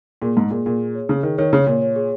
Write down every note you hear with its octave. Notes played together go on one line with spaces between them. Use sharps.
A#2 G#4
G#2 G#4
A#2 G#4
A#2 G#4
G#4
C#5
C#3 G#4
D#3 G#4
D#3 C#5
C#3 C#5
A#2 C#5
C#5
G#4